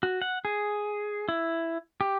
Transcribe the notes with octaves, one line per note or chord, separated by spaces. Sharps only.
F#4
F#5
G#4
E4
G4